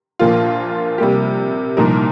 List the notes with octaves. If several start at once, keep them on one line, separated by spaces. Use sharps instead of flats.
A#1 A#2 F3 A#3 F4
C3 G3 A#3 G4
C2 A#2 F3 D#4 A#4